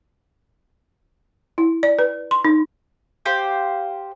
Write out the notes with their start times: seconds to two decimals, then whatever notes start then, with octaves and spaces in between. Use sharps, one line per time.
1.58 E4
1.83 D5
1.99 B4
2.31 C6
2.45 D#4
3.25 G4 C5 F5